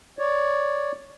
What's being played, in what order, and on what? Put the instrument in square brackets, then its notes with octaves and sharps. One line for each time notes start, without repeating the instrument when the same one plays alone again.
[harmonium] C#5 D5